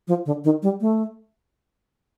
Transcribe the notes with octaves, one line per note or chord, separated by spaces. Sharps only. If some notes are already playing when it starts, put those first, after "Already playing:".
F3
D3
D#3
G3
A3